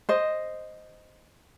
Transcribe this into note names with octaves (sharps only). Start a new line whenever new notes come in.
C5 D#5